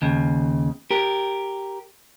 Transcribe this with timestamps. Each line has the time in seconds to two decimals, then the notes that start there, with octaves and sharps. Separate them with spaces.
0.02 D#2 C#3
0.91 G4 A#4